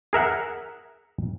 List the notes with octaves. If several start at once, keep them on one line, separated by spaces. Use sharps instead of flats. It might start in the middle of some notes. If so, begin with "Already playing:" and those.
G#4 A#4 E5 F#5